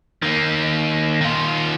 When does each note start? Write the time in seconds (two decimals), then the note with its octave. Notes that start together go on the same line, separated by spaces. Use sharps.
0.22 D#3 A#3
1.21 D#3 F4